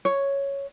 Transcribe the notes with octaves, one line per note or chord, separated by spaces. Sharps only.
C#5